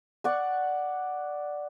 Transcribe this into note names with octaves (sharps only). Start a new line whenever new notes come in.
D5 F#5 C#6